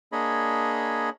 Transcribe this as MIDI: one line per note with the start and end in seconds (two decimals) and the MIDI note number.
0.12 1.10 58
0.12 1.10 62
0.12 1.10 68
0.12 1.10 73
0.12 1.10 75
0.12 1.10 83